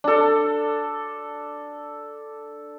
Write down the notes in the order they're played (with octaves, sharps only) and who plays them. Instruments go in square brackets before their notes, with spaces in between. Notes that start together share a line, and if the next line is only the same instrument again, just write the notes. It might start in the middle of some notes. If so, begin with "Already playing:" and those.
[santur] D4 A4